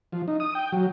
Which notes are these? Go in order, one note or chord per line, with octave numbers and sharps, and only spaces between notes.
F3
D#4
D#6
G5
F#3